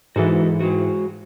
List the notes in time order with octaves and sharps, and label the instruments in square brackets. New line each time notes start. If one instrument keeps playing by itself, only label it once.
[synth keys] G#2 E3 [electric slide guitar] F#4 A4
[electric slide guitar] G#3 F#4